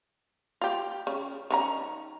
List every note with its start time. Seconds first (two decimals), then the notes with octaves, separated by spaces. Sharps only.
0.61 F4 G4
1.07 C#3
1.50 D#3 C#4 A#5